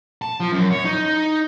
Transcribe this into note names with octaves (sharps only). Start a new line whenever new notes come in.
A5
F3
F#2
C#5
D#4